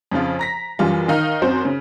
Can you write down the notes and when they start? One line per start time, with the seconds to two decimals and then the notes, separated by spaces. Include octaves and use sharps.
0.12 F2 C#3 F3 F4
0.39 A#5 A#6 B6
0.79 F#2 E3 G3 F4
1.08 D#3 D#4 F5 F6
1.42 F#2 F#3 C4 F#4 C5
1.65 C#3